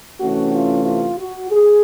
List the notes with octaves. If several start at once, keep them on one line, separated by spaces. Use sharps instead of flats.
C3 E3 A3 C#4 F#4
F4
F4
F#4
G#4